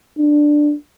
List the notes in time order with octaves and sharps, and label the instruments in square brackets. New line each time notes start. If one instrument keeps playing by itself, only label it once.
[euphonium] D4